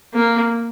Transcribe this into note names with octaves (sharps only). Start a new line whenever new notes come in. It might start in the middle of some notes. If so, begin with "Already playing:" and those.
A#3